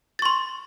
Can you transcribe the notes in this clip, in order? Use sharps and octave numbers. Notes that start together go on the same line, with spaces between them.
C6 C#6 A6